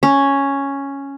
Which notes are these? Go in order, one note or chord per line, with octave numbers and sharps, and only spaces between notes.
C#4